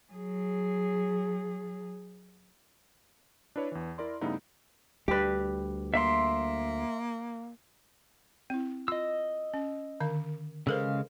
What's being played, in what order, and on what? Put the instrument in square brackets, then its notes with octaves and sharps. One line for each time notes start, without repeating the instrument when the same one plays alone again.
[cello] F#3 G#4
[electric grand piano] D4 E4 B4 C#5 D5
E2 E3
E4 A#4 D5 C6
G2 C#3 A3 B3 D#4 E4
[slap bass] D2 G3 [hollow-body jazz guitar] G4 B4
[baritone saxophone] A#3 [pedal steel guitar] E5 C6
[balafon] C4 E4
[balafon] F4 [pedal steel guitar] D#5 E6
[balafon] C#4
D3 D#3 F5
[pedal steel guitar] C#3 G#3 F5 [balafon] A4 A#4 C5